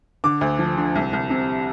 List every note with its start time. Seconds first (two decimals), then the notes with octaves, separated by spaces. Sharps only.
0.24 D3 D6
0.41 D2
0.59 F3
0.77 D3
0.95 C2
1.13 C2
1.30 C3